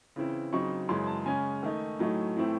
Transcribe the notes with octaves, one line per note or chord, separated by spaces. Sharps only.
C#3 E3 C4 E4
C#3 F#3 C4 D#4 C#6
F#2 C#3 E3 G#3 C6
A5
C#3 G#3 C#4 G#5
D#3 A3 D#4
A2 F#3 A3 D#4
A2 E3 A3 C4 E4